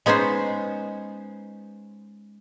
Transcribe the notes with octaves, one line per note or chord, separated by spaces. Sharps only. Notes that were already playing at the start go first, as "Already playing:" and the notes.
G#3 B3 C#4 D#4 C5